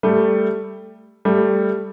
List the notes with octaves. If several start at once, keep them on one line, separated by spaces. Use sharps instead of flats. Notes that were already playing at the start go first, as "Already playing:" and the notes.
G3 A3
G3 A3